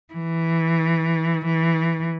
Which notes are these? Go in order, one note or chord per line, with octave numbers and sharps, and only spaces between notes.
E3
E3